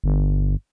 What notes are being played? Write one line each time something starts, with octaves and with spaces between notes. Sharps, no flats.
G1